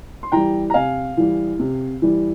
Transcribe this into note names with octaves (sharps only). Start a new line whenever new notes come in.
C6
E3 G3 G5 A#5
A#5
C3 F5 G#5
E3 G3
C3
E3 G3